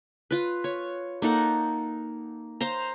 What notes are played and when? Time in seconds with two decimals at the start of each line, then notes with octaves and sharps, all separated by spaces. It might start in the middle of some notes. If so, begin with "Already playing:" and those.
0.31 F4 B4
0.64 C#5
1.22 A#3 D#4 A4 F#5
2.61 C5 F5 A#5